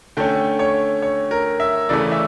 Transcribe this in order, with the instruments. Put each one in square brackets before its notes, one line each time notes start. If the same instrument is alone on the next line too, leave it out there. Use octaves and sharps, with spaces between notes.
[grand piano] D3 A3 C#4 G5
C#5
C#5
A#4
E5
C#3 E3 A3 D5
E5